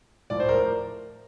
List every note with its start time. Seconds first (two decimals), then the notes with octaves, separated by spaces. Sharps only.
0.30 A2 F3 D5
0.40 C5
0.49 A#4